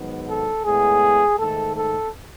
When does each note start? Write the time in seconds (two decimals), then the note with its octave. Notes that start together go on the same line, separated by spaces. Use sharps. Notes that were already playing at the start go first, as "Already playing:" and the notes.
Already playing: G#2 D#3 F#3 B3
0.29 A4
0.65 A2 G#3 B3 G#4
1.39 G#2 D#3 A3 A4
1.76 A4